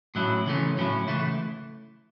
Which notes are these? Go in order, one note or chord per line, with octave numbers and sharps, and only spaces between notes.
A2 F#3 C#4 E4
C#3 E3 A3 C#4
A2 F#3 C#4 E4
C#3 E3 A3 E4